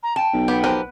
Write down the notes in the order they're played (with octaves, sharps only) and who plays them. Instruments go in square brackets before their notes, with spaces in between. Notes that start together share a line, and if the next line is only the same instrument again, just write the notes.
[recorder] A#5
[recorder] G5 [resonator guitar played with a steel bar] A5
[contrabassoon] B1
[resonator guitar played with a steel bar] B3 [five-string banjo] G4
[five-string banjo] F3 G4 A#4 [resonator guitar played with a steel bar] B4